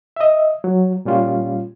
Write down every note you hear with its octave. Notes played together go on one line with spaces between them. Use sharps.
D#5 E5
F#3
A#2 G3 C#4 F4